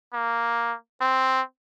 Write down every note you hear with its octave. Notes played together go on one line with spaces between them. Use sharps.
A#3
C4